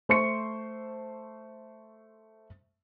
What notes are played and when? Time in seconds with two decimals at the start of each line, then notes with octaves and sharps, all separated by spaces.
0.09 A3 C5 C6 C#6 C#7